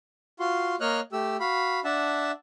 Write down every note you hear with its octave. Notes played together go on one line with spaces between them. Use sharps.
F4 F#4 C6
A#3 C#5 D#5 F6 F#6
A3 G4 E6
F#4 F5 B5
D4 E5 F#5 A5